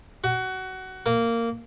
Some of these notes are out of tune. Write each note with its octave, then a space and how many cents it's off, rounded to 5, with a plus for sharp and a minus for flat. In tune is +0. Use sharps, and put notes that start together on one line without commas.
F#4 +20
A#3 -15